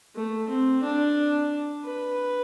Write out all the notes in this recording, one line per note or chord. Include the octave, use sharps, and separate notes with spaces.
A3
C4
D4
B4